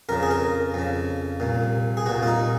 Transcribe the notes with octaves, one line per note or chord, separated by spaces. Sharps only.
F2 C#3 A#4
G#4
A#4
F2 C#3
C2 A#2
G#4
C2 A#2 F#4
F4
D#4